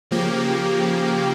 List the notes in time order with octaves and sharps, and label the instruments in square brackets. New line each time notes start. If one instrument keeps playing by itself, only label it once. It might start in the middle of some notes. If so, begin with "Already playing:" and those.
[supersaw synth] C#3 F3 A#3 G4